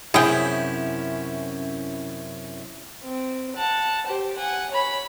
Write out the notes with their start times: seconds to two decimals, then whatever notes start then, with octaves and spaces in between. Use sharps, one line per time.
0.14 F#2 C3 C#4 E4 G#4 G5
3.03 C4
3.56 F#5 A5
4.06 G4 C5
4.36 F#5 G#5
4.71 C#5 B5